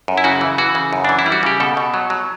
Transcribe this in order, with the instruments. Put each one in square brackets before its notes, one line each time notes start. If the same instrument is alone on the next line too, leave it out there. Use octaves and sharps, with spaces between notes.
[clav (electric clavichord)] F#2
E4
C#3 F#4
E3
E3 F#4
C#3
F#2
E3 D4
E4
G3
F#4
C#3 G4
B2 A4
B2
F#3
F#3